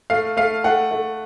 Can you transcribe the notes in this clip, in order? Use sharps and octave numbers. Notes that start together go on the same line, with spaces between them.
A3 F5
A3 F5
A3 F#5
A3